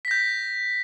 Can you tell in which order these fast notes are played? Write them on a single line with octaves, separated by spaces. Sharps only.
B6 A#6 G6